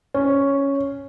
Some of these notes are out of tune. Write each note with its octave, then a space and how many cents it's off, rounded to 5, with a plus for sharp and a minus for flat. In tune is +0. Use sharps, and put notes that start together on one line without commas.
C#4 +0